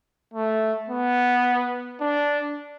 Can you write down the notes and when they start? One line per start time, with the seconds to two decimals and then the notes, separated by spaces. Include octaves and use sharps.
0.34 A3
0.89 B3
2.01 D4